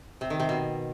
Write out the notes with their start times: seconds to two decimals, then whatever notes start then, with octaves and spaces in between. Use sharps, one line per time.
0.21 C3
0.30 D#3
0.40 C3
0.49 B2